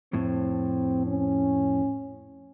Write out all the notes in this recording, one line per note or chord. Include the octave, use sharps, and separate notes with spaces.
F2 A2 C4
C#4